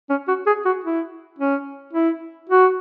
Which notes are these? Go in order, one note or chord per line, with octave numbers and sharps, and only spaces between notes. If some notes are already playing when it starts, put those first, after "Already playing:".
C#4
F#4
G#4
F#4
E4
C#4
E4
F#4